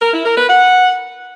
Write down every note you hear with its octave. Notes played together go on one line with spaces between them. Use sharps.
A#4
E4
A#4
B4
F#5